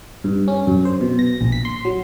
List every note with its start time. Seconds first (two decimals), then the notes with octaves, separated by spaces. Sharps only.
0.24 G2
0.48 C#4
0.67 F#2
0.85 C5
1.01 B2
1.19 A#6
1.41 A#1
1.52 B6
1.65 C6
1.85 F#3